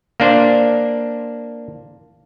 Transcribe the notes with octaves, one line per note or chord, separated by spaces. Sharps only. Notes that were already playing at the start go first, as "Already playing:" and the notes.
A#3 D4 C5